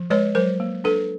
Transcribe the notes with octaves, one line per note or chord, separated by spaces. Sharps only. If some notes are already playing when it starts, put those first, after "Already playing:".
Already playing: F3
G#3 B4 C#5
F#3 A#4 C5
A#3
D4 A4 B4